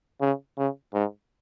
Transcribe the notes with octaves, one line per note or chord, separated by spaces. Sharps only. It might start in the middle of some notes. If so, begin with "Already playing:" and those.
C#3
C#3
G#2